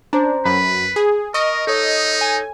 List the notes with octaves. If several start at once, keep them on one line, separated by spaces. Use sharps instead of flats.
C#4 D4 C5 A#5
F#2 B4 B5
G#4
A#4 D#5 C#6 D#6 A#6
D#4 A4 C#5
G#5